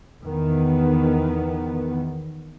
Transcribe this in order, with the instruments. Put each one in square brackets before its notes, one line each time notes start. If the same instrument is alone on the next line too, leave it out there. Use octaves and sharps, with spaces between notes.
[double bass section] E2 D#3 B3